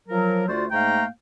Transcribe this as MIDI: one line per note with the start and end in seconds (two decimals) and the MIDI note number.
0.09 0.47 53
0.09 0.47 54
0.09 0.47 70
0.48 0.65 38
0.48 0.65 57
0.48 0.65 65
0.48 0.65 66
0.48 0.65 72
0.48 0.65 74
0.71 1.05 44
0.71 1.05 57
0.71 1.05 58
0.71 1.05 77
0.71 1.05 79
0.71 1.05 82